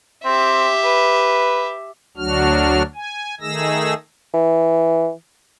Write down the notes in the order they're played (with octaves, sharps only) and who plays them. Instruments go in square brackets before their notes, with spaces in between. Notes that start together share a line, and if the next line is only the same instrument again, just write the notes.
[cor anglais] C4 [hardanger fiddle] G4 E5
[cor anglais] B4
[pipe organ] D2 F#3 D4 F#4 F6
G#5
D#3 A3 D#4 G#4 E6 A#6
[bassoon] E3